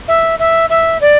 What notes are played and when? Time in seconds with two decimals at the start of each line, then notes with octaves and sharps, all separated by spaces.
0.08 E5
0.39 E5
0.70 E5
1.01 D5